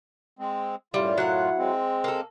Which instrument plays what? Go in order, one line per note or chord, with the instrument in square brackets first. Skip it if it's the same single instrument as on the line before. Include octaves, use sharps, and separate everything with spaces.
[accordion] G#3 C4
[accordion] F#2 A2 F4 [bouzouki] G3 [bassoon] E4
[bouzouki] F#3 F#5
[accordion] G#3 C4
[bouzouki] A#3 A4